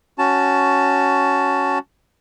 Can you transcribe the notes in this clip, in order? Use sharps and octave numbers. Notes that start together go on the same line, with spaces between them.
C#4 F#4 A5